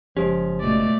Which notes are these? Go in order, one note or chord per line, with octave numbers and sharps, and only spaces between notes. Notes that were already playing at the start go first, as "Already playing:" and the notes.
F#1 F3 G#3 C#4 G4
C#2 B2 A3 D5